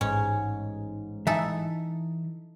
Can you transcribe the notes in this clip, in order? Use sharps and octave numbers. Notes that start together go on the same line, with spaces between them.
A1 G#2 C#4
E3 D#4 A4 E5